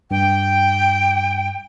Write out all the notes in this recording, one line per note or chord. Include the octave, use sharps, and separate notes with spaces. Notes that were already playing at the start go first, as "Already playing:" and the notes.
G2 G5